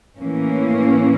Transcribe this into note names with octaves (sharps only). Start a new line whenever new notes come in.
A2 E3 A#3 C#4